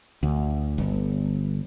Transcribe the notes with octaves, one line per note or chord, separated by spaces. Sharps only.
D2
G1